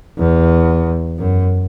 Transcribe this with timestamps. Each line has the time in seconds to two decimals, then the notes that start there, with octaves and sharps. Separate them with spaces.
0.19 E2
1.19 F#2